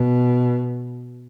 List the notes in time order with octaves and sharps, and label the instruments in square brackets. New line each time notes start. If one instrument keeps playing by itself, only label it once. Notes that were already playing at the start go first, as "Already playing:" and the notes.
Already playing: [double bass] B2